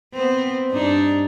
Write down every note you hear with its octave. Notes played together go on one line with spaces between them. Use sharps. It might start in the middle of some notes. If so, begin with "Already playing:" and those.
B3 C4
G2 D4 D#4